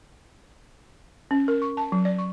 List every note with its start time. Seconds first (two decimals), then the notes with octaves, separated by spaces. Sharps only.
1.31 C#4
1.48 A#4
1.62 C#6
1.77 A5
1.92 F#3
2.05 D5
2.19 C#6